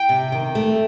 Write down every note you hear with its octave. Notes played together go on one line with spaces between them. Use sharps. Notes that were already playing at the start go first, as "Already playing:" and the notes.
Already playing: G5
C3
D#3
A3